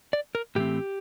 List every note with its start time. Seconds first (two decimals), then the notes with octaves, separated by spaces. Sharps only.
0.13 D5
0.35 A#4
0.55 A2 E3 A3 C4 G4